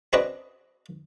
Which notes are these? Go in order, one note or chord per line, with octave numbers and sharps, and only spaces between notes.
C4 D4 F#4 G#4 B4 D#5